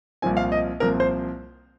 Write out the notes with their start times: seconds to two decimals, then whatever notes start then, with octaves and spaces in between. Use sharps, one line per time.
0.22 C2 A#2 F3 C4 G#5
0.37 F5
0.52 D#5
0.80 C2 A#2 F3 C4 A#4
1.00 C5